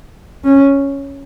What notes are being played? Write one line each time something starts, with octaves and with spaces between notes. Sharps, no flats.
C#4